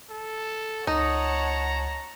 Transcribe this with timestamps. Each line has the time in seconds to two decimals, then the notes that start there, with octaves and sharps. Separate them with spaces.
0.10 A4
0.87 C#2 D#4 C#5 F#5 A5 A#5